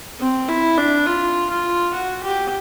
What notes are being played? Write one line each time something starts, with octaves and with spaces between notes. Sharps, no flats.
C4
E4
D4
F4
F4
F#4
G4